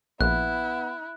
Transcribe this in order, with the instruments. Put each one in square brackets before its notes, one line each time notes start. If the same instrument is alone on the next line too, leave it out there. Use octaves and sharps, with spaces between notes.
[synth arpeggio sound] A#1 [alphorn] B3 [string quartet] E4 [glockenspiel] F#6